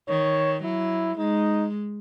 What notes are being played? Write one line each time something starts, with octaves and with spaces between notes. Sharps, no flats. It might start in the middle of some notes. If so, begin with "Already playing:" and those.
D#3 C#5
F#3 E4
G#3 D#4